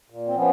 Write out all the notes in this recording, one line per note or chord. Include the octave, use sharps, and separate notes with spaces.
A#2
C4
F3 B3 C#4